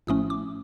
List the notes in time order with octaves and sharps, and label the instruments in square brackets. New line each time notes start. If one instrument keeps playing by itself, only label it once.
[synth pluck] A#1 A2 F3 A3 C#4 D#6
D6